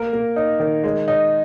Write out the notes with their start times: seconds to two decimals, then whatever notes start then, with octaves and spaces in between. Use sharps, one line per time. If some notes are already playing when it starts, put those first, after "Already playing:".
Already playing: A#3 A#4
0.13 A#3
0.36 D#4
0.60 D#3
0.84 G#3
1.08 D#4